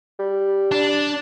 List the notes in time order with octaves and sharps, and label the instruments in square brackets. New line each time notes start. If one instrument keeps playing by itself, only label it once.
[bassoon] G3
[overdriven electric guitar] D4